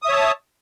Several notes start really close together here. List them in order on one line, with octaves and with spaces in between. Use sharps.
D#6 E5 C#5 A5